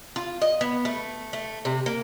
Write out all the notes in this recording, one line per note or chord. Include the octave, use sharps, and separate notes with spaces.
F4
D#5
B3
A3
A3
C3
A#3